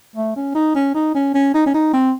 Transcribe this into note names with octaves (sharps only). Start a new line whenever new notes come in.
A3
C#4
D#4
C#4
D#4
C#4
C#4
D#4
C#4
D#4
C4